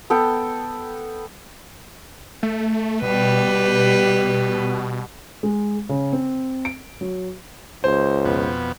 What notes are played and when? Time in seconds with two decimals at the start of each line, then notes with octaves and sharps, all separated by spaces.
0.10 B3 A4 G5
2.43 A3
3.02 B2 G3 G4 B4
5.43 G#3
5.89 C#3
6.13 C4
6.65 D7
7.01 F#3
7.84 C#2 C5
8.25 F2 B2 B3